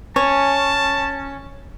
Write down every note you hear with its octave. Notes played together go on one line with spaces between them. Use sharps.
C#4 C#5 A5